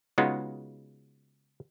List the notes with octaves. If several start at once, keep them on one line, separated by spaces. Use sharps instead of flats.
C#3 G#3 B3 D#4 F4 F#4